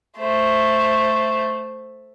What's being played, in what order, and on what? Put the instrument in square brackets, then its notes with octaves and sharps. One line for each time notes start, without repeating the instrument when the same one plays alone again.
[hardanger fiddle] A3 C5